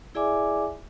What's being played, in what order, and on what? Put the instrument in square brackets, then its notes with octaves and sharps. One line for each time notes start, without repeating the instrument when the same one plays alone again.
[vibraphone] E4 G#4 D5 E5 G#5 D6